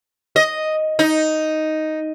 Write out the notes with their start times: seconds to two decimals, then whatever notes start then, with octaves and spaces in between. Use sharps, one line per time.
0.36 D#5
0.99 D#4